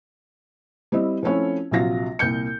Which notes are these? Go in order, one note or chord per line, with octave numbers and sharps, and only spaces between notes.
G3 C4 E4 D#5
F3 A3 C4 C#4 E4 C#5
A#1 C3 F#3 F4 A#6
C2 A#2 G6 C#7